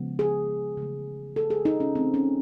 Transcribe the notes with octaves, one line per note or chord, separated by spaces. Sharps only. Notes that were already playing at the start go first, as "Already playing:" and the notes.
Already playing: C#3 F3 G#3 B3
G#4
C#3 E3 A3
A4
G#4
D#4
C#4
E3 A3 C4
C#4